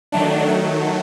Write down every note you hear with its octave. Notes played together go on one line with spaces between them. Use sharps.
D#3 F#3 A3 D4
D#3 F#3 A3